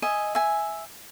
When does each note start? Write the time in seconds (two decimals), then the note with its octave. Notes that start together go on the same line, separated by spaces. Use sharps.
0.02 D#5 E5 G#5
0.35 E5 G#5